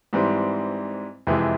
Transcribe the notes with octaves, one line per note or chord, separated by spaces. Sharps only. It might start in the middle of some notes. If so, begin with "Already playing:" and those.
G#2 E3 G3 C4
F2 C3 E3 G#3